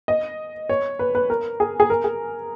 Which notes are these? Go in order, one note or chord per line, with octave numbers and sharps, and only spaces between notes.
D#5
C#5
B4
B4
A#4
G#4
G#4
A#4
G#4